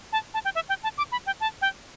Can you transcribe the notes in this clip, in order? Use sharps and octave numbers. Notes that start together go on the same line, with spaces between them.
A5
A5
G5
E5
G5
A5
D6
B5
G5
A5
G5